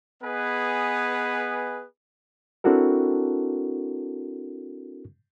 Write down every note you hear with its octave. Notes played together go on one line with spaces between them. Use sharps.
B3 G#4 B4 D#5 G#5
C4 D4 E4 F#4 A4 A#4